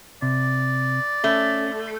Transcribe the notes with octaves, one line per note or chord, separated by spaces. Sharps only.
C3 D5
A3 C#4